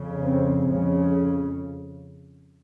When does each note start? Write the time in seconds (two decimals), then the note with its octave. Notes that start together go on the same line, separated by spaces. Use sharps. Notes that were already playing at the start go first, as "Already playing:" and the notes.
Already playing: F2 C#3
0.24 C4
0.66 F2 C#3 G#3